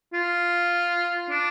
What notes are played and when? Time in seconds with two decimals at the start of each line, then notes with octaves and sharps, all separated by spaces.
0.14 F4
1.31 D4